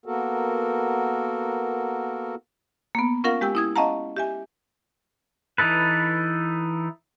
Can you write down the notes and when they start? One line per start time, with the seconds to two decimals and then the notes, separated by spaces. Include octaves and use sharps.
0.06 A#3 B3 F#4 A4 A#4
2.95 A#3 B3
3.24 C#4 F4 A#4 F5 F#5
3.41 G#3 G4 G5 E6
3.55 E4 D#6 G#6
3.76 C#4 D#5 F5 F#5 A5 A#5
4.17 G4 E5 G#5
5.58 E3 D#4 E4 A4 B4